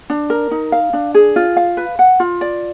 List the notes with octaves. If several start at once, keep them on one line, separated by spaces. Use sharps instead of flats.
D4
A#4
D#4
F5
D4
G#4
F4
F5
B4
F#5
F4
D5